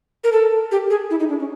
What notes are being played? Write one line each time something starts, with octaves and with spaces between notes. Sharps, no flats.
A#4
A4
G4
G#4
E4
D#4
D4
C#4